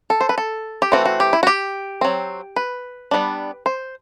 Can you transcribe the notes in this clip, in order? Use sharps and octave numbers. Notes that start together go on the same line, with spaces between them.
A4
C5
B4
A4
G4
E3 A3 C4 F#4
F#4
G4
E4
F#4
G4
F#3 C4
B4
G3 B3 D4
C5